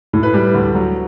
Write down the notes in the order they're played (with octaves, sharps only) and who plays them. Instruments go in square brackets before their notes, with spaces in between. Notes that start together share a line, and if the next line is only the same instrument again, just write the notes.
[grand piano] A2
B4
G3
D2
F#3